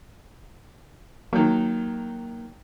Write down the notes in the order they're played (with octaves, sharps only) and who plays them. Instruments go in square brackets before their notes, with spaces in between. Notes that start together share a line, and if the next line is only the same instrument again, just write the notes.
[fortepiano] D#3 F#3 [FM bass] A#3